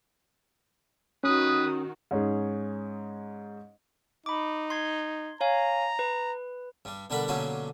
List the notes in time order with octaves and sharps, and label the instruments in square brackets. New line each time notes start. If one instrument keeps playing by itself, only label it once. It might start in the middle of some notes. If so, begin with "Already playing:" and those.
[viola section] D#3 F#4 [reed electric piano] C#4 [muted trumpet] B4 [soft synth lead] D#6
[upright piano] G#2 C#4 D#4 G#4
[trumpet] D#4 [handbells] B5 D6
[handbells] C6 G#6
[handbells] C#5 F5 G#5 [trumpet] A#5
[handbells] B4
[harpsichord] G2 G3
B2 D3 G3 D4 A#4 B5
B2 D3 F#3 A#3 C#4 G4